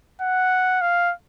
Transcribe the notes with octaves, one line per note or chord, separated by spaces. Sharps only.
F#5
F5